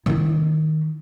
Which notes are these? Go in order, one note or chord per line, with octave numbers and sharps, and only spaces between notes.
D#3 E4